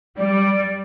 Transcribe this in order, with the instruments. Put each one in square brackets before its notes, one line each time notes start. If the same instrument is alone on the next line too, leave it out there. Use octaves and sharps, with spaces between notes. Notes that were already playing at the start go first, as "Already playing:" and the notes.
[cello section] G3 [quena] D5